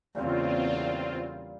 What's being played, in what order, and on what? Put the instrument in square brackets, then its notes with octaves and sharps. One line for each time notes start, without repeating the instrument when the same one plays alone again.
[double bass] E2 C#3 [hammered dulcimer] A#2 G3 F5 [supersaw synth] C4 F4